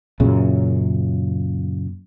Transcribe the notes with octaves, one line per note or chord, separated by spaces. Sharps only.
F#2 A#2 C#3